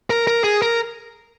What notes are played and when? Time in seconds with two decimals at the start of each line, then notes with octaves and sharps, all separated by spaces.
0.10 A#4
0.27 A#4
0.44 G#4
0.62 A#4